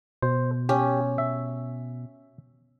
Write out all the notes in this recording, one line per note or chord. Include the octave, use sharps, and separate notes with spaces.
B2 C5
C#4 G4
E5